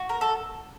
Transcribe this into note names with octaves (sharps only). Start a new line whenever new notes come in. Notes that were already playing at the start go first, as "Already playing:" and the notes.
Already playing: F#4
A#4
A4